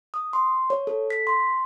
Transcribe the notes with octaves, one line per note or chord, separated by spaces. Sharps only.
D#6
C6
C#5
A4
B6
C6